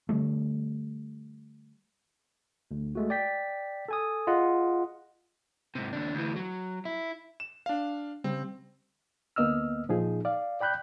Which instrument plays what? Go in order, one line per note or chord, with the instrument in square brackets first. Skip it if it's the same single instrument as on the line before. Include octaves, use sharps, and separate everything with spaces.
[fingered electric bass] D3 E3 G3 A3
[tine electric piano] D2
G#3 A3 F#4
D5 G5 B6
A4 G#5 D#6
F4 G#4 D#5 F#5
[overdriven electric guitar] G#2 C3
D#2 D4
D2 E3
F#3
E4
[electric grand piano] E7
D4 F5
[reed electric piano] C#3 G3 [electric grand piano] C4
[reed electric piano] D2 A#3 B3 D#5 E6 F6
A#2 F3 D#4 G#4
D5 F5
D5 G5 B5 F#6 G6